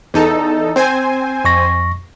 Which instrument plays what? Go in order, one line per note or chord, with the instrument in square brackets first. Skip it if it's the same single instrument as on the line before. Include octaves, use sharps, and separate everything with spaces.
[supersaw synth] E2 D#4 A4
C4 C5 G#5
[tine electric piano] F2 C#6 A#6